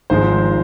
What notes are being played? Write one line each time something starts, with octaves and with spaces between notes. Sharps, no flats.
G#1 G#2 F3 G#3 C5